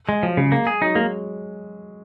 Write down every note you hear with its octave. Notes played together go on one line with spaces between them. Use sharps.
G#3
F3 F#3
C#3 G#3
G#3 A#3
G#4
F#3 D#4
G#3 A#3